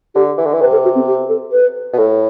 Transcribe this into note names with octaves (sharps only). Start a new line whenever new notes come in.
D3 G4
E3
D3
E3
C3 B4
A4
F#4
C4
G4
A4
B4
B2
A2 A4